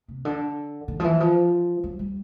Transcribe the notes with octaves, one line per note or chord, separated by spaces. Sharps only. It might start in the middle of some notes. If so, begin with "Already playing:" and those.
C3
D3
D#3
F3
E3
F3
F#3
G3